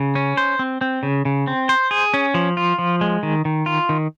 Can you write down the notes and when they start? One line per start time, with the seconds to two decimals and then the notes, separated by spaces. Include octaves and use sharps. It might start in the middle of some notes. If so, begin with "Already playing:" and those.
Already playing: C#3
0.15 C#4
0.37 C5
0.59 C4
0.81 C4
1.03 C#3
1.25 C#3
1.47 C4
1.69 C5
1.91 G#4
2.14 C#4
2.34 F3
2.57 F4
2.79 F3
3.01 G#3
3.23 D#3
3.45 D#3
3.66 F4
3.89 D#3